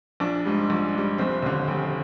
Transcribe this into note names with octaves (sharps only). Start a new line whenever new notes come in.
A#1 D4
G#2 G3
A#1
G#2 G3
F1 C4
D#2 D3
F1